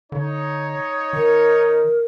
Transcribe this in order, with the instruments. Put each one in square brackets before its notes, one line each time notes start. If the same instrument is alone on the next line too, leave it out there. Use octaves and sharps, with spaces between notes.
[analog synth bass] D3 [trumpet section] D#4 [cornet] C#5
[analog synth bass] D#3 [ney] A#4